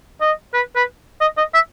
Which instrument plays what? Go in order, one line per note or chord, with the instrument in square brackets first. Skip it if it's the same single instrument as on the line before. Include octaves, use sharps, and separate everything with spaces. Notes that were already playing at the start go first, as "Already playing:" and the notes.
[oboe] D#5
B4
B4
D#5
D#5
E5